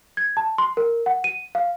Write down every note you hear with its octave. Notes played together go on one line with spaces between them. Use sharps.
G#6
A5
C6
A#4
F#5
D#7
F5